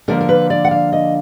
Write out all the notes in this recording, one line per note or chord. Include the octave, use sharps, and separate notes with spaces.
D3 F3 A#3 A#4
A#4
B4
D5
F#5
F5
D#5